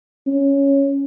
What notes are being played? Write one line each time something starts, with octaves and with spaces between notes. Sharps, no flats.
C#4